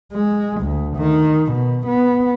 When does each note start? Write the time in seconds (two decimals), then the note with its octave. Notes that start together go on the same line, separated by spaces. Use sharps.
0.12 G#3
0.61 D2
0.97 D#3
1.52 B2
1.87 B3